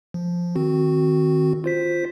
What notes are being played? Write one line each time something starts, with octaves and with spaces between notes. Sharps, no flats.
F3
D#3 C4 F#4
F4 C5 B6